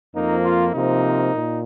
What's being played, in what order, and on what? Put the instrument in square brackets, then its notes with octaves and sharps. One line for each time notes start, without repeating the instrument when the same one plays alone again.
[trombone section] F2 F3 A#3 D#4
F4
C3 F3 A#3 D#4
A#2